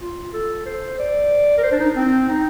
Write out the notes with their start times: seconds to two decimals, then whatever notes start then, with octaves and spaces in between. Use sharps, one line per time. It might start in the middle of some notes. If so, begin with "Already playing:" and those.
0.01 F4
0.33 A4
0.66 C5
0.99 D5
1.58 A#4
1.63 C5
1.72 D4
1.80 D#4
1.97 C4
2.29 D#4